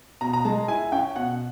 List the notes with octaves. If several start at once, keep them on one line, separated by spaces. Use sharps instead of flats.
B2 A#5
A#5
G#3 A5
E4 G#5
C#4 G5
B2 F#5